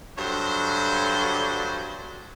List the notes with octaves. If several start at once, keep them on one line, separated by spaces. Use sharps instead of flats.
G2 D3 F#3 C5